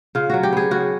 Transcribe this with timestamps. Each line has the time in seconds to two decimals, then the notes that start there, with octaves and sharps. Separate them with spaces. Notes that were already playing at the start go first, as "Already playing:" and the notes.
0.15 C#3 F4
0.30 F#3 F#4
0.43 G4
0.53 B3 G#4
0.71 C#3 F#4